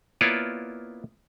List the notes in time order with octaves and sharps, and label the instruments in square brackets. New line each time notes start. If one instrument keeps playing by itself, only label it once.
[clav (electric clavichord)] A#3 B3 E4 F4 C#5 D5